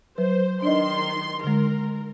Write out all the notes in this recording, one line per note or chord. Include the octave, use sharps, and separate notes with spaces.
F#3 B4 C5
D#3 D4 D5 D#5 C6
D3 G#3 A#4